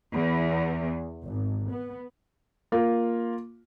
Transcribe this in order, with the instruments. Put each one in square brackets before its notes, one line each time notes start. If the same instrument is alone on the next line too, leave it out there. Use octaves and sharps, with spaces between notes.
[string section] E2
G#1
B3
[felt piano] A#3 F4